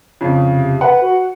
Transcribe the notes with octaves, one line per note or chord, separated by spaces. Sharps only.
F2 C#3
C3
B4 F#5
F#4